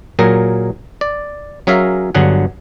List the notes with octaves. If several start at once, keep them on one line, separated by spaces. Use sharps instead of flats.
A#2 F#3 G#4 A#4 A#5
D5
F#3 C#4 G#4 A#4 E5 F5
G1 G2 D3 F#3 G#4 F#5